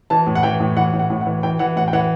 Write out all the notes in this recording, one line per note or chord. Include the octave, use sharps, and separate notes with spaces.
E3 A5
A2
F#5
E3 G5
A2
E3 F#5
A2
F#5
A2
F#5
E3
E3 G5
E3 F#5
A2 F#5
G5
E3 F#5